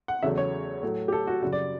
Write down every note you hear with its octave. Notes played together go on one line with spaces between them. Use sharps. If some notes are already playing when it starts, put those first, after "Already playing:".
F#5
E2 C#3 F#3 A3 E5
C#5
A2 F#3 A3
G4
A4
F#4
F#2 C#3 G3 F#4
D5